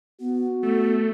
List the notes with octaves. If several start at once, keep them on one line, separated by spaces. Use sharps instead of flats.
B3 F#4
A3 B3